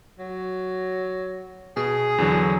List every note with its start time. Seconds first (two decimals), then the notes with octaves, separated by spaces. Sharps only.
0.19 F#3
1.77 B2 G#4
2.18 E2 D3 F#3